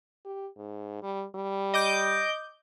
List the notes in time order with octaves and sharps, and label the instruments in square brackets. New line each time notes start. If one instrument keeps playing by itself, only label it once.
[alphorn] G4
G#2
G3
G3
[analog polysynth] D#5 D6 G6